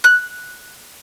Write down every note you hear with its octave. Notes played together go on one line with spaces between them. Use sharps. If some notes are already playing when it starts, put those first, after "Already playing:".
F#6